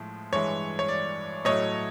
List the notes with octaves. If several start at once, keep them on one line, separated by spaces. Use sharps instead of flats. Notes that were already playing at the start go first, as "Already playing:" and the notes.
Already playing: A2 F3 G#3
G2 E3 G#3 C#5
C#5
D5
A2 F#3 A3 C#5 D#5